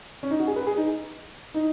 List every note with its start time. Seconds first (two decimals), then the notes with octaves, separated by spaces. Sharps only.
0.23 C#4
0.31 D#4
0.39 F#4
0.47 G#4
0.56 B4
0.67 G#4
0.77 D#4
1.54 D#4